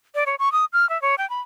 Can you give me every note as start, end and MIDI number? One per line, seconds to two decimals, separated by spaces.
0.15 0.24 74
0.26 0.35 73
0.39 0.52 85
0.52 0.65 87
0.73 0.88 89
0.90 1.00 76
1.02 1.15 73
1.18 1.28 79
1.30 1.41 83